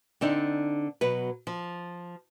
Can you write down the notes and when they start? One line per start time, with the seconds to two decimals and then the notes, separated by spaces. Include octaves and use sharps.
0.21 D3 C4 D4 D#4
1.01 B2 F#3 B4
1.47 F3